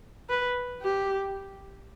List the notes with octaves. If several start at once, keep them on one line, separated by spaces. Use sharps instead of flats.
B4
G4